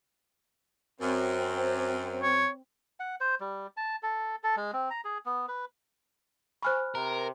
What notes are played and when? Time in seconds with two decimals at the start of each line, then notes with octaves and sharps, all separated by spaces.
1.01 F#2 C4
2.22 C#5
3.00 F#5
3.21 C5
3.40 G3
3.77 A5
4.03 A4
4.44 A4
4.57 G#3
4.73 C4
4.90 A#5
5.05 G#4
5.26 B3
5.48 B4
6.63 C5 G#5 B5 C#6 F6 F#6
6.95 C3 A#4